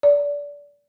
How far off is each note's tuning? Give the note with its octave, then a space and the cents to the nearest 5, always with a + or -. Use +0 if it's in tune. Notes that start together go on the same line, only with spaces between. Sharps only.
D5 -25